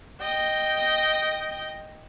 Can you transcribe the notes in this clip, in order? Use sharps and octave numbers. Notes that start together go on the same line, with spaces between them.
D#5 G5